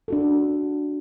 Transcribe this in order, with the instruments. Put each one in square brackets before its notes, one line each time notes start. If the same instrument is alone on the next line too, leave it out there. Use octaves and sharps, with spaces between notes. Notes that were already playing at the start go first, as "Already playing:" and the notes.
[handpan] D4 F#4 A4